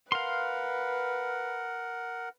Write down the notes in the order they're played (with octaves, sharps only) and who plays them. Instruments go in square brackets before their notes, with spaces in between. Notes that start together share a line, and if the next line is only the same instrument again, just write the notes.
[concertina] A#4 F#5 [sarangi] B4 [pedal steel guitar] F5 C6